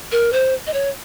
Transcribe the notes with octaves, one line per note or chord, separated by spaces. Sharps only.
A#4
C5
D#5
C#5